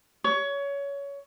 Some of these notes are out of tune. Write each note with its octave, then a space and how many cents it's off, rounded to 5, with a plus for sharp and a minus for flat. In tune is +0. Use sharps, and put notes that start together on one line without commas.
C#5 +20